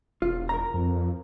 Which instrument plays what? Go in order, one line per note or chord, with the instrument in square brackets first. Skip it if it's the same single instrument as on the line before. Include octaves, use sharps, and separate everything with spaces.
[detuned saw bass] E1 [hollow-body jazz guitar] F4
[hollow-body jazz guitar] A#4 A#5
[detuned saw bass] F2